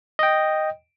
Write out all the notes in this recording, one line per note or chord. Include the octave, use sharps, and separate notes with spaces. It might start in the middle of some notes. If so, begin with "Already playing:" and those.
D#5 G5